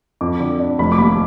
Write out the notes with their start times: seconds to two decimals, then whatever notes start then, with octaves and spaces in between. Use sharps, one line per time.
0.21 F2 D6
0.40 D3
0.60 D4
0.79 F1 B5
0.92 D6
0.98 D#2 B5